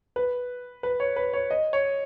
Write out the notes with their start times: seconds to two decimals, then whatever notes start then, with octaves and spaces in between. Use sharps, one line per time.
0.16 B4
0.83 B4
1.00 C#5
1.16 B4
1.34 C#5
1.51 D#5
1.73 C#5